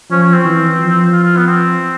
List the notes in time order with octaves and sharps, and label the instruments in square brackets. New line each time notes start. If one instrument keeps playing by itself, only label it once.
[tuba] F3 [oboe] C#4
[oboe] C#4
C4
[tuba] E3
F3
[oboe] F4
F4
B3
C4